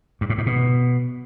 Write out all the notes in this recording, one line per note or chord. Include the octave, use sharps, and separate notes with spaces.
G2
A2
G#2
B2